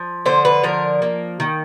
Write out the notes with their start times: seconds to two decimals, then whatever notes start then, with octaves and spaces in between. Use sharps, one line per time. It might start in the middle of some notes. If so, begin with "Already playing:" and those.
Already playing: F3
0.26 D3 C5
0.45 B4
0.63 F3 A#4
1.02 A#3
1.40 D#3